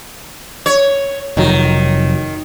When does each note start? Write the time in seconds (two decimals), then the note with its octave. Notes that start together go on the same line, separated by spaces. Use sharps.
0.66 C#5
1.37 F1 D#3 F#3